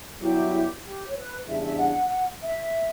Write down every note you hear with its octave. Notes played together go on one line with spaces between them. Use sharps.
G2 F#3 B3 E4 G4
G4
C#5
B4
E2 C#3 G3 D4 E5
E5
F#5
E5